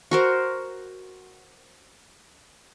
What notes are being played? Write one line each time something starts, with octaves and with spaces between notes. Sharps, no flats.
F#4 A#4 C5